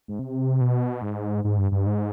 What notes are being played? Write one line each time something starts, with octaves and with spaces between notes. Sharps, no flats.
G#2
C3
B2
G#2
G#2
G2
G2
G#2